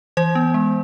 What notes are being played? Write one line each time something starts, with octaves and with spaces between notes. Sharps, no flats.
E3 C5
B3
G#3